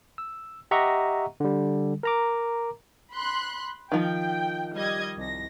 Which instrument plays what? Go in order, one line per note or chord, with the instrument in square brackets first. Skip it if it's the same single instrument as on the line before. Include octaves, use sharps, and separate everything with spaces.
[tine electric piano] E6
G4 D#5 E5 F#5 A#5 C#6
D3 G3
A#4 A#5 D6
[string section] B5 C6 F#6
[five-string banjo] D#3 F3 [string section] G5
[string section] G3 D#5 G#6
C2 A#6